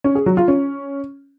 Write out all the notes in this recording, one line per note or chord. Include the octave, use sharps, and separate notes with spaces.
C#4
G#4
F#3
F4
C#4